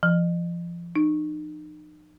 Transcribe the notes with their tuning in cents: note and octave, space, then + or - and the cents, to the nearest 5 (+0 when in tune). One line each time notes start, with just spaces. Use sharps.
F3 -30
D#4 -35